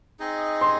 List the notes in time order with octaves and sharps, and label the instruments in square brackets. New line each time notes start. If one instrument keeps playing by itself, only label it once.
[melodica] C4 D#4 G#4 D#5
[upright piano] C6